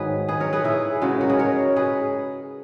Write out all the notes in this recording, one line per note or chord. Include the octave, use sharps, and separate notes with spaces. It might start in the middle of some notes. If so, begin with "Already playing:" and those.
Already playing: G#2 D#3 F#3 G#4 B4
G#4 B4
A#4 C#5
G#4 B4
E4 G#4
C#3 G#3 F#4 A#4
F#4 A#4
G#4 B4
A#4 C#5
G#4 B4